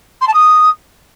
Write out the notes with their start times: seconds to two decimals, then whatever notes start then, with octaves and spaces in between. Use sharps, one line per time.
0.21 C6
0.27 A5
0.34 D#6